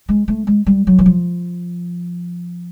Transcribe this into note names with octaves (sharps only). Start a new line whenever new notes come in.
G#3
A3
G#3
G3
F#3
E3
F3